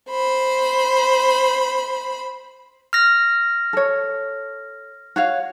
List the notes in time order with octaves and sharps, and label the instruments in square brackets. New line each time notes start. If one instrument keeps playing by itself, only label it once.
[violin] C5 B5
[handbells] F6 A#6
[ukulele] A4 C#5
F#4 C#5 F5